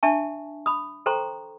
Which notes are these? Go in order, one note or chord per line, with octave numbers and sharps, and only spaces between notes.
D4 E5 G#5 A5 C#6
B5 D#6
A4 C5 G5 A#5 C6 C#6